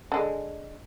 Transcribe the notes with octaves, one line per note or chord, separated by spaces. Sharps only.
D3 G#3